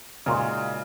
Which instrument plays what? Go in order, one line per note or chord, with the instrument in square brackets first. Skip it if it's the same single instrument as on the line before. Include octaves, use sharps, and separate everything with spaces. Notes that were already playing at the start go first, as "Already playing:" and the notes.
[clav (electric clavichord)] A#2 G#3 D#4 F#4 A#4 [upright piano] C#3